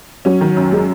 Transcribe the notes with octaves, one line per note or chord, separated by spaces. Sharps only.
F#3 C#4
D#3
F#2
G#3